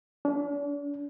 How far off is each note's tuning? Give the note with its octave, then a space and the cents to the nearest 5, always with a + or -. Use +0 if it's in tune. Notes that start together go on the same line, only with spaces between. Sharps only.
D4 -40